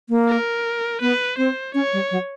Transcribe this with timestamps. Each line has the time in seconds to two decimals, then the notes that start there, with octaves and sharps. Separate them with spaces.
0.09 A#3
0.28 A#4
1.01 B3 B4
1.37 C4 C5
1.74 C#4 C#5
1.93 G3
2.11 F#3